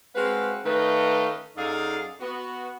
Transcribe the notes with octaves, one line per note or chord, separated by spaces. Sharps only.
G#3 C4 F#4 B4 F5
D#3 A3 C#4 B4 D#5 F5
F#2 D#4 G#4 A4 D5 F5
B3 F#4